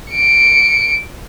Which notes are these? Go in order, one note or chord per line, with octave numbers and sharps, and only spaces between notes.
C#7 D7